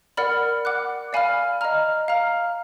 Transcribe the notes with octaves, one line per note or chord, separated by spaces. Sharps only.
A#4 D5 F#5 B5 F6
F#5 D6 F#6
D5 F5 G#5 B5 F6
D#5 A#5 F6
F5 A#5 F6